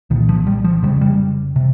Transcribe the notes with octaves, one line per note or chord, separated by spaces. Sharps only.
C2 A#2 D#3
F3
G3
F3
F1 D#2 C#3 G3
G3
C3